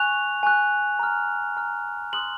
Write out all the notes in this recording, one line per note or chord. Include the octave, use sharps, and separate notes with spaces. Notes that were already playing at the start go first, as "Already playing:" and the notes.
Already playing: G#5 C#6 F#6 F7
G#5 C#6 F#6
A#5 F6
A#5 F6
C6 D#6 F#6 F#7